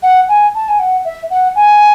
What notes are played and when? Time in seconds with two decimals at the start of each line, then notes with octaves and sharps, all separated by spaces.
0.03 F#5
0.29 G#5
0.55 A5
0.68 G#5
0.79 F#5
1.05 E5
1.30 F#5
1.55 G#5